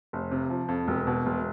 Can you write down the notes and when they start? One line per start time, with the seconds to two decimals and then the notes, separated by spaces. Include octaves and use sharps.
0.13 F1
0.31 C3
0.50 F3
0.68 F2
0.87 E1
1.07 B2
1.26 E1